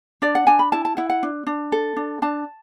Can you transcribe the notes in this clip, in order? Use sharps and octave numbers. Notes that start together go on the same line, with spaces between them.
D4 D5
F#5
D4 G#5
B5
E4 A5
A5
E4 F#5
F#5
D4
D4
A4
D4
D4 A5